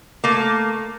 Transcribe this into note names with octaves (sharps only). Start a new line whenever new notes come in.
A3 A#3